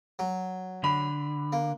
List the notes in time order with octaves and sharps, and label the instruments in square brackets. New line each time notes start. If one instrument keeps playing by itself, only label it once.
[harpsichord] F#3
[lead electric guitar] D3 [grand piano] B5
[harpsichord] A#3